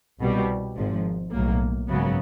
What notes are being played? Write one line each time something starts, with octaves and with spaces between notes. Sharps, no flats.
C2 B2 G3
G#1 G#2 F3
B1 A2 F#3 A#3
G#1 F#2 C#3 F#3 B3